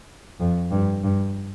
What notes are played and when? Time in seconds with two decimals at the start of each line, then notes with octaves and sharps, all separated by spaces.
0.40 F2
0.72 G2
1.03 G2